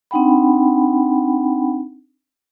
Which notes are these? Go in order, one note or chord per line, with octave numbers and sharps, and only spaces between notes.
C4 D4 D#4 F#5 G5 B5